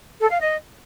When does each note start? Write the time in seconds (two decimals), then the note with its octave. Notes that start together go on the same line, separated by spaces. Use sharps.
0.20 A4
0.29 F5
0.39 D#5